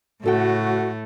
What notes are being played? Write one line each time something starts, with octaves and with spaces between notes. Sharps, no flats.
A2 C#3 A3 F#4 A4 G5